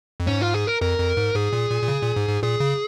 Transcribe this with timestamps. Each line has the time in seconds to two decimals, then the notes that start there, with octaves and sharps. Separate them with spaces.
0.20 F2
0.27 G#2 C#4
0.41 F4
0.54 G#4
0.67 A#4
0.81 F2 A#4
1.00 F2
1.17 G#2
1.35 G#2 G#4
1.53 A#2
1.70 A#2
1.82 A#2
1.88 C#3
2.02 A#2
2.16 G#2
2.29 G#2
2.43 A#2 G#4
2.60 C#3